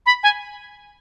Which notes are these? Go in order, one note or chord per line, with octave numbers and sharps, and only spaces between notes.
B5
G#5